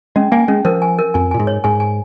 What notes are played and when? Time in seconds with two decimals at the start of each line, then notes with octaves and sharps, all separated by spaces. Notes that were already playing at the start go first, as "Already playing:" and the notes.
0.16 G#3 C#4
0.32 A#3 G#5
0.48 G#3 C#4
0.65 F3 A#4
0.82 G#5
0.99 A#4
1.14 F2 G#5
1.31 A#2 G#5
1.39 G#2
1.47 C#5
1.64 G#2 G#5
1.80 G#5